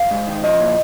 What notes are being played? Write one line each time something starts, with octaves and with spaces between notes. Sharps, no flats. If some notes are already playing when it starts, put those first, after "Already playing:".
Already playing: F5
G#2
D#3
F3 D#5
A#2